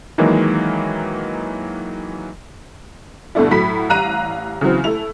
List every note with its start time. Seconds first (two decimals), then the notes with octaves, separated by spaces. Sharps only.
0.18 D#3 E3 F#3 G#3 A#3 D#4
3.35 G2 B2 D3 A3 D4 E4
3.51 A2 F#3 B5 B6
3.89 A1 G3 F5 A#5 F#6 D#7
4.61 C#3 E3 F#3 C4
4.84 A3 E4 F7